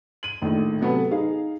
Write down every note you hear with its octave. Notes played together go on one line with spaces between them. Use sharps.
D#7 F#7
A#1 A2 D#3
C3 F#3 B3 F#4 A4 B4
D#4 G#4 F5